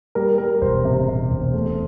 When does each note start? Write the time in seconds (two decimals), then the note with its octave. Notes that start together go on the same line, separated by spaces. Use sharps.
0.15 G3 A#4
0.38 G3 A#4
0.61 E1 C5
0.85 C3
1.08 C3
1.30 E1
1.54 A3